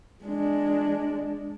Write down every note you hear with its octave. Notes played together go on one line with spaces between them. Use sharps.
G#3 D4